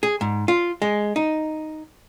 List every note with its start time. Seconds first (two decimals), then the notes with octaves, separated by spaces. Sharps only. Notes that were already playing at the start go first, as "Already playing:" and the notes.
0.03 G#4
0.21 G#2
0.48 F4
0.82 G#3
1.16 D#4